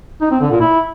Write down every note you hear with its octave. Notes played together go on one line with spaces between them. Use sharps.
D#4
C4
D3
A#2
E4